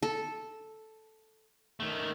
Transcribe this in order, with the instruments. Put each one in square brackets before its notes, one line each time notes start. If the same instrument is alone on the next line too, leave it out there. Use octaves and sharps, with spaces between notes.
[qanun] A4
[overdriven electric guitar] D#3 A3